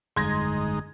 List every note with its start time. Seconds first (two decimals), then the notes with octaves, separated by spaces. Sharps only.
0.16 G1 F2 G#3 D#4 C6 G#6 A#6